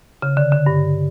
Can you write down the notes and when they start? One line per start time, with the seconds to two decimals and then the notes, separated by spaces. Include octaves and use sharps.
0.22 C#3
0.37 D3
0.52 D3
0.66 G2